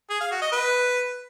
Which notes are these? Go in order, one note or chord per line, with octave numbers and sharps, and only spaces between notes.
G#4
F5
F#4
D#5
B4